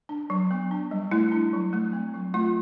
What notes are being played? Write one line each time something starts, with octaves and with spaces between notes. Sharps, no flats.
D4
F#3
B3
D4
G3
A3 E4
D4
F#3
A3
C4
F#3
A3 F4